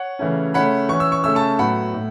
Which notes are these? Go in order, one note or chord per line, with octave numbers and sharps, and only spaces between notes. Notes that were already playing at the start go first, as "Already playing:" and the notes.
Already playing: C#5 F#5
C#3 E3 A3 C#4
C#3 A3 C#4 F#5 B5
E3 C#4 C#6
E6
C#6
C#3 A3 C#4 E6
A5 C#6
A2 F#3 B3 F#5 B5
A2